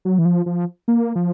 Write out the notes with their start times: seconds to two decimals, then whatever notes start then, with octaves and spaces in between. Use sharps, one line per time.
0.05 F#3
0.19 E3
0.25 F3
0.46 F3
0.88 A#3
1.15 F3